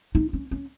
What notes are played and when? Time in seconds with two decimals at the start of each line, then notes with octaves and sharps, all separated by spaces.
0.15 D#4
0.33 C#4
0.51 C#4